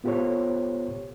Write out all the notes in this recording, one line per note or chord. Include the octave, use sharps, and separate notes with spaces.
B3 F4 G4 A4 C5 C#5